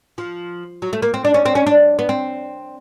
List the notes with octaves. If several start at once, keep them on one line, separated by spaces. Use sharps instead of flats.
F3
F#3
A3
A#3
C4
D4
C#4
C4
C#4
D4
B3
C4